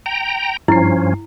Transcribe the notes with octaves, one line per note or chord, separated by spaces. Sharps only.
G5 A#5
G2 F3 C#4 E4 C7